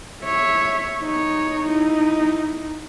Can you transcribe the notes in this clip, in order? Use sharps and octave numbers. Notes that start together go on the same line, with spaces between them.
C#5 E5
D#4 C#5
D#4 E4